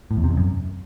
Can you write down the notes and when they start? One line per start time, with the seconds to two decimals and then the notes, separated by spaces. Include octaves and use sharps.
0.11 A2
0.17 E2
0.24 C3
0.30 F2
0.37 F#2